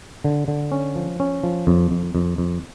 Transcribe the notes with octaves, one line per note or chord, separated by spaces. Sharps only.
D3
D3
C#4
F3
C#4
F3
F2
F2
F2
F2